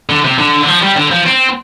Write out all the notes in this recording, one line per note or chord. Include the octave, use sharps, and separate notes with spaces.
D3
C3
D3
D3
F3
G3
D3
F3
C4